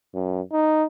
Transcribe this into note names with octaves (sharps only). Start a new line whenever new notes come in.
F#2
D#4